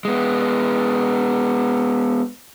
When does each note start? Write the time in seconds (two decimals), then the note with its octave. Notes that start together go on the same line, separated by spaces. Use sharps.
0.05 G#3 B3